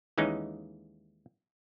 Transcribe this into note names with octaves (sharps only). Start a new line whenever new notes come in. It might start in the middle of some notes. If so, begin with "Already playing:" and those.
D#2 E3 G#3 C#4 D#4